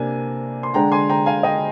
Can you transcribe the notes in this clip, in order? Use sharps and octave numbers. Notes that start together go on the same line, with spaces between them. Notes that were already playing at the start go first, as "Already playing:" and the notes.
Already playing: C3 A#3 D4 G#5
C6
D3 G#3 D4 G5 A#5
G#5 C6
G5 A#5
F5 G#5
D#5 G5